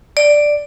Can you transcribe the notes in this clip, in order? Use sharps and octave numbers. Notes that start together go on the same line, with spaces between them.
D5